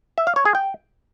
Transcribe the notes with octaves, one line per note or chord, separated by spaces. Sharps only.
E5
F5
C#5
G#4
G5